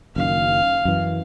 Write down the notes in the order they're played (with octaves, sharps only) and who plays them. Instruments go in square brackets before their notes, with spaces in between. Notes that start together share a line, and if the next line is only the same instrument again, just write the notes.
[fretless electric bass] F#1 F#2 D#3 [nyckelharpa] F5
[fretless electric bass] F#2 E3